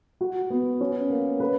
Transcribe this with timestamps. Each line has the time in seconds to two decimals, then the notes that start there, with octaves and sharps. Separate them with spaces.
0.21 F#4
0.50 B3
0.81 C#4
1.10 A#3
1.40 B4